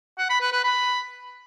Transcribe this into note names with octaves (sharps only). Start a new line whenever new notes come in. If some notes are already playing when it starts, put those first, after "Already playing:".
F#5
B5
B4
B4
B5